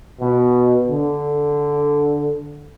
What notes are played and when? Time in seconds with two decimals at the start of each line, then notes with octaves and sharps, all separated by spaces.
0.19 B2
0.87 D3